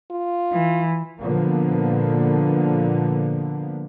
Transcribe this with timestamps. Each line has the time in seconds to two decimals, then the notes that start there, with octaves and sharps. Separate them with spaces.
0.11 F4
0.53 E3
1.20 A#2 D3 F3 A#3 B3